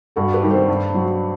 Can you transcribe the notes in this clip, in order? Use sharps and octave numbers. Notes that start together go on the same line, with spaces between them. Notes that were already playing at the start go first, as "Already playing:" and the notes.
G2 F#4 A4
G4 B4
D#3 G3
A4 C5
G2
F#3